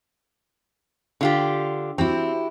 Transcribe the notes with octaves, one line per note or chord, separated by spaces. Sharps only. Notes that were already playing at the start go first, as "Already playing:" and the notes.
D3 F4 G4
C4 E4 F#4 G4